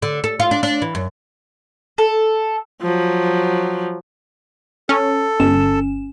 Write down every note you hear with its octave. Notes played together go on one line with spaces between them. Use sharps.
D3
A4
F4
D4
D4
E3
F#2
A4
F3 F#3
C#4 A4
G1 C#4 E7